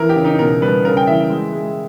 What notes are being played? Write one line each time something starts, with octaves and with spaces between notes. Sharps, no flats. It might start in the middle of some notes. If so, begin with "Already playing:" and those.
Already playing: E3 A#4
G4
C#3
D#4
B2 A#4
G3 B4
C#3 A#4
G5
E3 E5
G#3
G#3